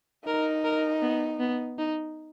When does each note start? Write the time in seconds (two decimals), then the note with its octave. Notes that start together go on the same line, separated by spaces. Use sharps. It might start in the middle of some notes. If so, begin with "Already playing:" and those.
0.27 D#4 A#4
0.64 A#4
1.02 B3
1.40 B3
1.79 D#4